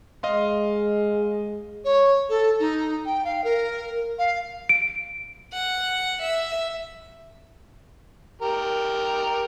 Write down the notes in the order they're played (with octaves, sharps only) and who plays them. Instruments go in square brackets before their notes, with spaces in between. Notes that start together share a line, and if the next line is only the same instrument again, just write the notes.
[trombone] G#3 [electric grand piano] D#5 F5 C6
[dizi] C#5
A4
D#4
G5
F5
A#4
F5
[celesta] D7
[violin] F#5
E5
[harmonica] G4 A#4